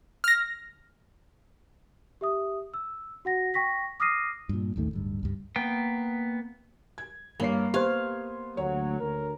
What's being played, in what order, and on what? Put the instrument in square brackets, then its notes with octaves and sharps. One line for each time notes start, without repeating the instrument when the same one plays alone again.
[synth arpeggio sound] F6 A#6
[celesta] G4 E5 D#6
E6
F#4 F#5 A#6
G5 C#6 A#6 B6
D6 D#6 F6 A#6 C7 D#7
[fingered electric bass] G2 A#2
A1 D#2 D#3 A3
D1 G2
C#2 G2
[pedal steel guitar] A#3 B3 G5
[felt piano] G#6
[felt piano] G2 C#5 C7 [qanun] A#3
[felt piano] B3 C6 G#6 [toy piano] G4 C5 [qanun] F5
[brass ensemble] D2 F#3 [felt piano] C#5
[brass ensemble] D2 A#4